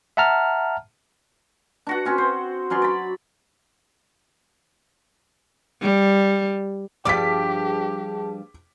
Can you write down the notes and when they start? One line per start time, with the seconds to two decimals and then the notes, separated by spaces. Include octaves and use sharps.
0.17 E5 F#5 A5 A#5 F6
1.87 D4 F#4 F#5
2.05 C4 C#4 F#4
2.18 C5
2.70 F#3 C#4 D5 C6
2.82 D5 B5
5.82 G3
7.05 G2 F3 G4 G#4 D5 A5 D6 B6